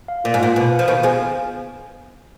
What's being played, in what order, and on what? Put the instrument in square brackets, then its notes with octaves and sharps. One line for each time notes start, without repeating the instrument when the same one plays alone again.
[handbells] F5
[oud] A#2 [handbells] F4
[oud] G#2
[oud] A#2 [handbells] F4
[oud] B2 [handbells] B4
[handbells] F5
[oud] F3
[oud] B2 D#3 [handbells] F5
[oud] F3 G#3 [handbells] B3